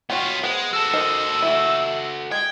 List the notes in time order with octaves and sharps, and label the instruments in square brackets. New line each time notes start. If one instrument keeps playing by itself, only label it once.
[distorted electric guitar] B3 F4 [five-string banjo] F#4 C#5 G5
[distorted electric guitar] G#3 [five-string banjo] B3 C5
[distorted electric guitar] F#4 A4 [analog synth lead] E6
[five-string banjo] D#4 A#4 C5
E3 A3 E4
[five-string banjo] G#3 [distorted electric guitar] G5 [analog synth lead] G#6